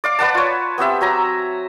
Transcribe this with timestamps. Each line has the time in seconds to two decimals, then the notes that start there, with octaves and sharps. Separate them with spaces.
0.04 D5 F5 D6
0.19 B4 D5 F#5 A5
0.35 F4 C#5
0.78 B3 C4 G4 E5
1.01 F#3 G#5 A#5